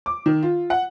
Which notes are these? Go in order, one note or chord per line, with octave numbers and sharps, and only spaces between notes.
D6
D#3
F4
F#5